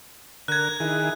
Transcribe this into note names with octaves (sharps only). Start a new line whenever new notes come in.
D3 A#4 F#6 G#6
D#3 E4 G#4